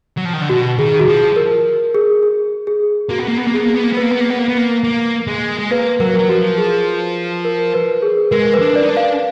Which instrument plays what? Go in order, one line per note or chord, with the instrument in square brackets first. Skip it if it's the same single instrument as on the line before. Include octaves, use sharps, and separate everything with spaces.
[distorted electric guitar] F#3
F3
D#3
D3
[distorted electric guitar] B2 [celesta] F#4
[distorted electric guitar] D#3 [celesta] G#4
[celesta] F#4
[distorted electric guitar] F3 [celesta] G#4
[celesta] A#4
G#4
G#4
G#4
[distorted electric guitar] A#3 [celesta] F#4
[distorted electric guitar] B3
A#3
B3
A#3
[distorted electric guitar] B3 [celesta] G#4
[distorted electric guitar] A#3
B3
A#3
[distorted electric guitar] B3 [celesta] B4
[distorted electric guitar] A#3
B3
A#3
B3
A#3
B3
A#3
A#3
G#3
G#3
[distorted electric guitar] A#3 [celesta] B4
[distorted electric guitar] F#3 [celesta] A#4
[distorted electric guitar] F#3
[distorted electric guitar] F3 [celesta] F#4
[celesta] G#4
A#4
B4
G#4
[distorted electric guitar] G#3 [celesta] A#4
[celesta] B4
[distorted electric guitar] D4
[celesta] D5
[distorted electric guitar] D#4
D4
[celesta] F5